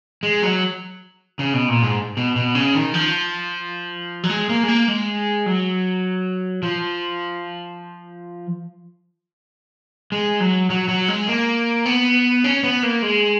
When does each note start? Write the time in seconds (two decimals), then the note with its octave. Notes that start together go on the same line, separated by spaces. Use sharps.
0.23 G#3
0.42 F#3
1.39 C#3
1.53 B2
1.68 A#2
1.83 G#2
2.17 B2
2.36 B2
2.55 C#3
2.75 D#3
2.94 F3
4.23 F#3
4.30 G#3
4.49 A#3
4.63 G#3
4.68 A#3
4.88 G#3
5.46 F#3
6.63 F3
10.12 G#3
10.40 F#3
10.70 F#3
10.88 F#3
11.08 G#3
11.27 A#3
11.85 B3
12.44 C#4
12.64 B3
12.83 A#3
13.02 G#3